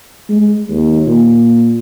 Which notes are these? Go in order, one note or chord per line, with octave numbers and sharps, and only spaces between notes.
G#3
D#2
A#2